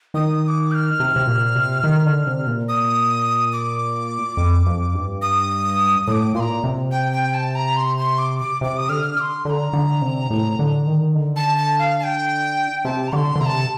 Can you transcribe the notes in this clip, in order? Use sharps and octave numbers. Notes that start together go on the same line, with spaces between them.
D#3 D#6
D#6
D6
G6
F6
C3
C3
A#2
C3
D#3
D3
C3
A#2
D#6
D6
F2
F2
G2
D#6
A2 D6 D#6
A#2 C6
A#5
C3
G5
G5
A5
A#5
C6
C6
D6
D6
C3 D6
D#6
D3 F6
D6
C6
D3 A#5 C6
D3
C3
A2
D3
D#3
D3
A5
A5
F5
A5
G5
C3 A5
A#5
D3 C6 D6
D3
C3 A#5
A5